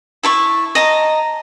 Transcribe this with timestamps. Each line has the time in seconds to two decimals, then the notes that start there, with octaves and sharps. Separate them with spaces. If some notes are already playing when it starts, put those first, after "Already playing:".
0.23 E4 A5 C#6
0.75 D#5 A5 A#5